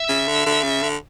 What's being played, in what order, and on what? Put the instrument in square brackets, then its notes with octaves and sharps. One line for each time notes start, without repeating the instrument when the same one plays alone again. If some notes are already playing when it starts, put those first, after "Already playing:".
Already playing: [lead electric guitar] E5
[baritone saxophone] C#3
D3
D3
C#3
D3